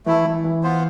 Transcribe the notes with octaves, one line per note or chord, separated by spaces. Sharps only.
E3 A3 E4 A4
E3
E3
B3 F4 C5